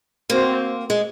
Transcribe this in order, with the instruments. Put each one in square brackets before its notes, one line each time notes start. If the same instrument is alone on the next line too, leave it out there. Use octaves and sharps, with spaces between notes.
[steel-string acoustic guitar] A#3 [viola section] C4 F#4 C5
[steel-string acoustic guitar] G#3